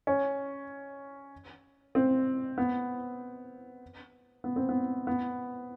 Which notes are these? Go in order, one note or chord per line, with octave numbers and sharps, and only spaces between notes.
C#4
C4
B3
B3
C4
B3
B3